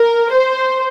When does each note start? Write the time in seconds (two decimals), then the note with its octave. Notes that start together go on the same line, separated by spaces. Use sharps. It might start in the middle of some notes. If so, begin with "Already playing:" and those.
Already playing: A#4
0.32 C5